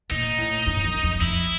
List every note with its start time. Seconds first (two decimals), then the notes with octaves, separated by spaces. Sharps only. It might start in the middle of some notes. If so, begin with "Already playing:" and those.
0.11 A#2 D#4
0.38 A2
0.67 G2
0.84 F#2
1.03 F2
1.20 F2 E4